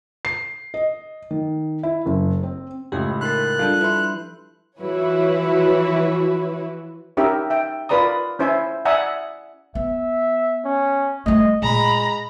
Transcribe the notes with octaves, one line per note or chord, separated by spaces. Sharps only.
C7
D#5
D#3
E4
F#1
C4
C#2 A2 G4
D#4 A#4 B5 C6 F#6 A6
F3 G3 D4 A4 F5 A5 G6
E4 B4 B5 C6
E3 F3 E4 F#4 B4 C#5
C#4 D#4 G4 A#4 D#5 E5
E5 G5
F4 A#4 B4 D5 A#5 D#6
C#4 E4 C5 E5 G#5
D5 E5 F#5 G#5 A#5 D#6
B3 E5
C#4
G3 A3 D#5
A#2 G#3 A#5 B5